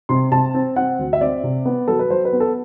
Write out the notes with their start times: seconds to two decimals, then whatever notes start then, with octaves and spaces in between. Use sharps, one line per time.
0.09 C3 C6
0.32 C3 A5
0.54 C4
0.76 C4 F#5
0.99 D2
1.13 E5
1.21 C4 D5
1.43 C3
1.65 B3
1.88 F#3 A4
1.99 B4
2.10 F#3 C5
2.25 B4
2.33 B3
2.40 A4